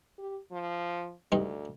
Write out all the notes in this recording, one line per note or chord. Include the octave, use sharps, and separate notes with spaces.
G4
F3
D2 G2 D#4